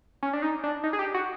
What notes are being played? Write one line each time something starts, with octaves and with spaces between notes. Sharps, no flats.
C#4
D4
D#4
D4
D#4
G#4
G4
F#4